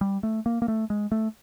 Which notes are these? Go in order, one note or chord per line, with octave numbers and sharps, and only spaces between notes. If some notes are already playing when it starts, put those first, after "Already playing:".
G3
A3
A#3
A#3
A3
G#3
A3